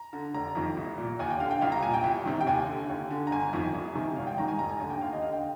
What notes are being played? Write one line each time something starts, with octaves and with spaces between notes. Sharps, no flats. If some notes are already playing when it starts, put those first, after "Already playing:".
Already playing: A#5
D3
F1 A#5
F2 D#3
C2
A#2
D#2 G#5
G5
D3 F5
G5
C2 F5
A#5
A#2 G#5
G5
C2
C3 D#3
G5
D#2 G#5
D3
D#2
D3
A#5
G1 G#5
F2 D#3
C2
C3 D#3
G#1 F5
G5
G#2 D#3 A#5
G#5
F1 A#5
G#5
D#2 D3 G#5
G5
D#2 F5
D#5
D3 F5
G5